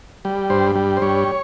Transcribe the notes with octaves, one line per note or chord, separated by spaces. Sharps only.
G3
G2 C5
G3
C5
G2 C#5